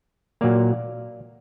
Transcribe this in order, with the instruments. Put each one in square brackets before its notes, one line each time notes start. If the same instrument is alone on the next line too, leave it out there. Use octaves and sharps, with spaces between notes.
[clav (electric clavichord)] A#2 F#3 A#3 D5 F5